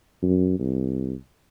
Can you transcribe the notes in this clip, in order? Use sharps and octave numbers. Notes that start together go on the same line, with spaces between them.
F#2
C2